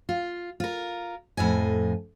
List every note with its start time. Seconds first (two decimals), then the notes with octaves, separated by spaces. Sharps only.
0.09 F4
0.60 F4 A#4
1.37 F2 A2 D#5 G#5